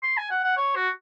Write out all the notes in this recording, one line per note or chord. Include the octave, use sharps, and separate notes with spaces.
C6
G#5
F#5
F#5
C#5
F#4